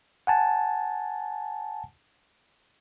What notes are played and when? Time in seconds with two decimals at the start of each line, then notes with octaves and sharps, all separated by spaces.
0.27 F#5 G#5 A5